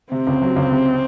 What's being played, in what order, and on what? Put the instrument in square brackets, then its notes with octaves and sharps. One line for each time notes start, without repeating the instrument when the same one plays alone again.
[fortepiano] C3 [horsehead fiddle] C4
[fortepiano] C#2
F#3
C#2
C3